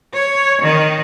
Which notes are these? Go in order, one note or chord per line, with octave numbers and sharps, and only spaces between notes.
C#5
D#3